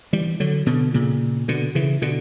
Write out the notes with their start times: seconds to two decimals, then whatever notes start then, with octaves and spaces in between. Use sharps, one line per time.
0.13 E3 G3
0.40 D3 F#3
0.66 B2 D3
0.94 A#2 C#3
1.48 B2 D3
1.75 C#3 E3
2.02 B2 D3